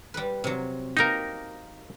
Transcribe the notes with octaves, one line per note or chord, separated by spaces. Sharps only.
G3 B4
C3 F#3
A#3 D#4 G4 A#4